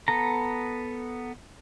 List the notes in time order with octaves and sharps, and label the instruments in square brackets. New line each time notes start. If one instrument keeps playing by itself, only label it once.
[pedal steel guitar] B3 A4 A#5